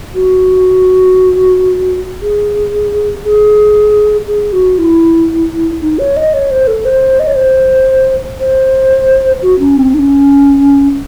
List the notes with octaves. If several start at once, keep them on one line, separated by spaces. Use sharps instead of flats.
F#4
G#4
G#4
G#4
F#4
E4
D#4
C#5
D#5
C#5
C5
A4
C5
D#5
C#5
C5
C5
F#4
C#4
C4
D#4
C#4